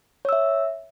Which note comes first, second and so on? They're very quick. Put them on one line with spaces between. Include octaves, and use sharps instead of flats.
C#5 E6 E5